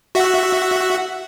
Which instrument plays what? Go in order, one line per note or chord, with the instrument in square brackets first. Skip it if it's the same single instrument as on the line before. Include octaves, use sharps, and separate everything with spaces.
[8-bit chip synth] F#4 E5 F#5